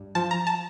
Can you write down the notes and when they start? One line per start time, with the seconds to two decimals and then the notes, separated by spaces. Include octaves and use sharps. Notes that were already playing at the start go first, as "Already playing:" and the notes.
Already playing: G2
0.15 F3 A5
0.31 A#5
0.47 A5